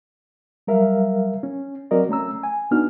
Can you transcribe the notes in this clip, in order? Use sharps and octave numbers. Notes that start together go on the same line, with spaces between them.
F#3 G3 A#4 E5 F5
C#4
F#3 C4 F#4 A#4 D5 D#5
A3 C#4 A#5 E6
G#5
B3 D4 D#4 F#4 F6